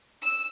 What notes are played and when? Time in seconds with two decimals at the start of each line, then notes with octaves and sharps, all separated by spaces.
0.23 E6